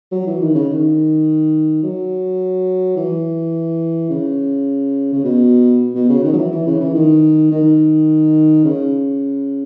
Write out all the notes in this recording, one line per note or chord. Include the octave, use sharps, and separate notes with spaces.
F#3
E3
D#3
C#3
D#3
F#3
E3
C#3
C#3
B2
B2
C#3
D#3
F#3
E3
E3
C#3
E3
D#3
D#3
C#3